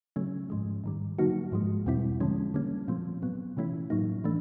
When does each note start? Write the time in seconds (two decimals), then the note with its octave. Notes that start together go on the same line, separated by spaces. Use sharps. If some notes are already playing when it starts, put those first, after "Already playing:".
0.16 C#3 F#3 A3 C#4
0.50 G#2 F3 G#3
0.84 G#2 D#3 G3
1.19 D3 F#3 A#3 D#4 F#4
1.52 G#2 F3 G#3
1.86 E2 B2 G3 C4 E4
2.20 D3 F3 G#3 C#4
2.54 D3 G3 A#3 C#4
2.88 A#2 F3 A3 C4
3.22 A#2 F#3 B3
3.57 C3 E3 A3 C#4 E4
3.90 A2 F#3 A#3 D#4
4.24 E3 A3 D4